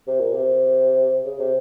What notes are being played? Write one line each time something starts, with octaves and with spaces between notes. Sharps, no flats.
C3
A#2
C3
C#3
C3